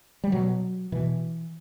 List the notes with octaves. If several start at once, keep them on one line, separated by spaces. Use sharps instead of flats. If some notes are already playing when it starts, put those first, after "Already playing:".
G3
B2 F#3
B2 E3